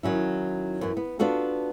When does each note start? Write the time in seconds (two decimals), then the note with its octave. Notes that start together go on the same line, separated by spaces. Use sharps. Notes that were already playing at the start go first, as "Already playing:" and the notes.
0.03 D#3 F#3 C#4 E4
0.81 F#2 E3
0.97 B3
1.19 B3 D4 F4 F#4 A4